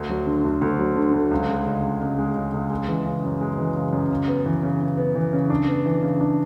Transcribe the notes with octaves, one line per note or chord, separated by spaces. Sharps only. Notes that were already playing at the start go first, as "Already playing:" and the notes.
Already playing: D2
F#3
D3
D2
D2
F#3
D3
D2
C#2
G#3
C#3
C#2
C#2
G#3
C#3
C#2
G#3
E3
C#3
F#2
G#3
E3
C#3
F#2
C#3
B3
E3
C#3
C#3
B3
E3
C#3
D4
B3
E3
C#3
D4